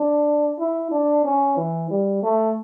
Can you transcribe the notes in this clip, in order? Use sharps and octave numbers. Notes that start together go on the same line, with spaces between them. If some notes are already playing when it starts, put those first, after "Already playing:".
Already playing: D4
E4
D4
C#4
E3
G3
A3